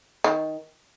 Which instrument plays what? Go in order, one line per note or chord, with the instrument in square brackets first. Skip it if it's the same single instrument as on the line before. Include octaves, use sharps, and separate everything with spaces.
[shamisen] D#3